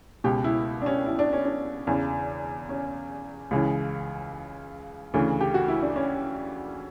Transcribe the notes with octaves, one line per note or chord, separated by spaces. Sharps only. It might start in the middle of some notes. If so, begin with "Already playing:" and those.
C#2 B2 G4
E4
D4
C#4
E4
D4
C#4
D4
E2 C#3 E3
C#4
C#2 C#3 E3
D2 C#3 E3
G4
F#4
E4
D4
C#4